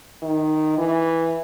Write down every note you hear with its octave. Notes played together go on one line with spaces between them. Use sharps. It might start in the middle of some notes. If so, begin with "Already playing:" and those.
D#3
E3